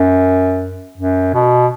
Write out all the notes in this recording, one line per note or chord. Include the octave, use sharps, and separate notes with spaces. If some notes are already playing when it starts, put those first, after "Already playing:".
Already playing: F#2
F#2
B2